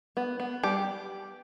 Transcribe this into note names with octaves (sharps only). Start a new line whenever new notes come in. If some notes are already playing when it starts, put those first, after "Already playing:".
B3
B3
G3 G4